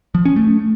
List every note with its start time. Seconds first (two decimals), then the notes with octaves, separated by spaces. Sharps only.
0.15 F3
0.25 C#4
0.36 A3